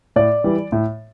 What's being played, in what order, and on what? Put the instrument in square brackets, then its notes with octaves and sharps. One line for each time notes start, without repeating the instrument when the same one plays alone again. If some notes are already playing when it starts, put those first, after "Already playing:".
[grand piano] A2 D5
E3 G3
A2